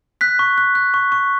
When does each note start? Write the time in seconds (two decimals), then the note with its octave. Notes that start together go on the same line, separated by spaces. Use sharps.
0.21 F#6 B6
0.39 C#6
0.58 F#6
0.75 F#6
0.94 C#6
1.12 C#6